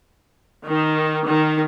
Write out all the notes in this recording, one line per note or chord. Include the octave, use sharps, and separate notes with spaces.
D#3
D#3